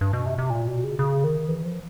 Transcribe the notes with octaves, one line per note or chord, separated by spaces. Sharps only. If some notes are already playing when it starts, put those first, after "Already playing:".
G2
B2
C3
C3
A#2
B2
C#3
C#3
D#3
E3
F3